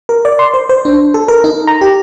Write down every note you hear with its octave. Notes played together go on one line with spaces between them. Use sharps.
A#4
D5
C6
C5
C5
D4
A4
A#4
D#4
A#5
G4